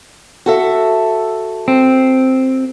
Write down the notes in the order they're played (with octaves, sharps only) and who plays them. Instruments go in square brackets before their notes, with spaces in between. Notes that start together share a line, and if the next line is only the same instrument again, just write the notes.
[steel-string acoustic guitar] F#4 A4 E5
[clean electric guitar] C4